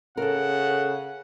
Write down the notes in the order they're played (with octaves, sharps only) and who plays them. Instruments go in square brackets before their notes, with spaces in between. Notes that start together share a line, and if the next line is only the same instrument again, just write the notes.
[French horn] C#3 [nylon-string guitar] A4 A#4 [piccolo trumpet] F#5